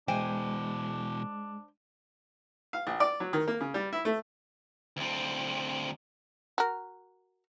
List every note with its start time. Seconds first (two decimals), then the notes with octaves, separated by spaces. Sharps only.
0.08 B2 E3 G#3 D4 C5 G5 G#5
2.73 F5
2.87 A#1
3.00 D5
3.20 F#3
3.33 D#3
3.48 A#3
3.60 C#3
3.74 G3
3.93 E4
4.05 A3
4.97 D2 C4
6.58 F#4 A#4